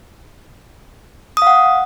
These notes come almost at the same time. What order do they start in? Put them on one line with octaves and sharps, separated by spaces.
D#6 F5 F#5